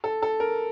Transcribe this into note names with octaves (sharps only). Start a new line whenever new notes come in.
A4
A4
A#4